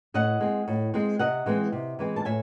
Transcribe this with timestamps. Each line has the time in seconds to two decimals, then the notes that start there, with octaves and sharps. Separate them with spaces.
0.14 A2 D#5 F#5
0.40 G#3 C4
0.68 A2
0.94 G#3 C4
1.19 C3 D#5 F#5
1.46 E3 G#3 C4
1.72 C3
1.99 E3 G#3 C4
2.16 A5
2.25 A2 E5 G#5